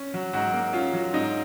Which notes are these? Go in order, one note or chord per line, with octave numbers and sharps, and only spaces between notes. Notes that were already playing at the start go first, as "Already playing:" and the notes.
Already playing: C#4
F#3
G#2 F#3 F#4
A#3
C#4 F4
F#3
G#2 D#4